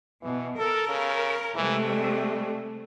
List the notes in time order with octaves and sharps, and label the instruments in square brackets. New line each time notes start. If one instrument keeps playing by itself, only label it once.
[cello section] B2 [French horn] E3
[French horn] A4 [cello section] A#4
[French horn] C#3
[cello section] C3 G#3 A3 [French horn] E3
[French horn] G3